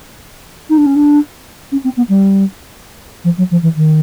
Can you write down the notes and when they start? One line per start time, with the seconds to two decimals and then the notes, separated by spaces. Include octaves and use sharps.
0.69 D#4
0.77 D4
0.86 C#4
0.95 D4
1.72 C#4
1.84 C4
1.97 B3
2.09 G3
3.24 F3
3.37 F#3
3.51 F3
3.62 E3
3.76 D#3